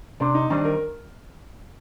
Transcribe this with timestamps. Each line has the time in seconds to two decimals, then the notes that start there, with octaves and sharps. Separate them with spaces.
0.20 C3 D4
0.34 D#4
0.50 D#3 G3 C4 D4 D#4
0.65 A#4